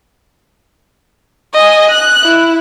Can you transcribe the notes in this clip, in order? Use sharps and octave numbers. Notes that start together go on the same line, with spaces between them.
D#5 G#5
F#6
E4